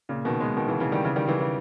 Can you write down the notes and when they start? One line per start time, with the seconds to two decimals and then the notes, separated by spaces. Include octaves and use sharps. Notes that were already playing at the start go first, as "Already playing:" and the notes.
0.09 A#2 C#3
0.25 B2 D#3
0.40 G#3 B3
0.57 B2 D#3
0.68 C#3 E3
0.80 C#3 E3
0.92 D#3 G3
1.04 C#3 E3
1.16 D#3 G3
1.27 C#3 E3
1.40 C#3 E3